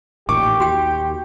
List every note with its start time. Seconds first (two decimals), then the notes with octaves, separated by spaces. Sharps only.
0.29 A1 A#2 D#3 G4 C#6 D6
0.60 D#2 F#4 G5